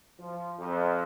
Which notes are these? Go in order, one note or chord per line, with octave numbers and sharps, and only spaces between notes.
F3
F2